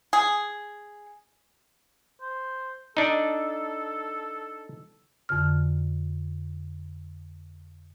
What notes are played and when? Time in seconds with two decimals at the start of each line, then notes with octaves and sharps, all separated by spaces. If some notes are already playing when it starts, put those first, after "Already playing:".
0.13 G#4
2.21 C5
2.97 D4 D#4 A4
5.29 F2 D3 F6